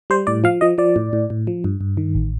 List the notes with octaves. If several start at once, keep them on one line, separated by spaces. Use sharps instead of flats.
G3 C5
A2 D5
F3 F5
F3 D#5
F3 D5
A2
A2
A2
F3
G2
G2
D#3
A1